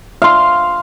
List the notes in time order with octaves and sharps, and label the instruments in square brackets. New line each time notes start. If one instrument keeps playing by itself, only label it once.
[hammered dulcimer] F5 C6